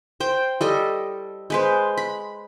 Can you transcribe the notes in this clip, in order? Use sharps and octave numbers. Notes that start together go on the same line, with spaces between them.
C5 G5
G3 A4 D#5
G#3 B4 C5
B5